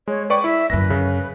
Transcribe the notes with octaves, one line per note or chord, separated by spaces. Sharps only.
G#3 C#5
B4 D5 G5 C#6
E4 E5
F#2 D3 B4 A#6
C#3